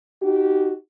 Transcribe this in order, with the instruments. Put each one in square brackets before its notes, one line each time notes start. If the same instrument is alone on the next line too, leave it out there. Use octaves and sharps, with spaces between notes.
[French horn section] D#4 F#4 G4